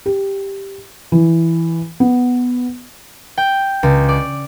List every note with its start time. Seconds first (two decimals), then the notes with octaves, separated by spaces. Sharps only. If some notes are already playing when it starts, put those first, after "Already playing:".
0.06 G4
1.12 E3
2.00 B3
3.38 G5
3.83 C#2
4.09 D5